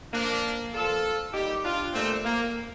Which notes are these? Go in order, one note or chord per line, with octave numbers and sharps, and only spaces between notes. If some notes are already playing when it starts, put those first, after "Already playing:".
A#2 F3 A#3 D4
A#2 F3 F4 A4
A#2 G3 D#4 G4
D4 F4
A#2 G3 A3 C4
A#3